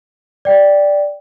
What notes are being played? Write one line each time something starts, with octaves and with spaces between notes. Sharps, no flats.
D5 G5